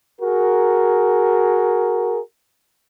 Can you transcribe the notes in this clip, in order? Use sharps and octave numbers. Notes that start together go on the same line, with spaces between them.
F#4 G#4 A#4